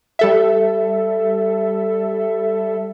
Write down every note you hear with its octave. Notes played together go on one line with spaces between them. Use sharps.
G3 A4 E5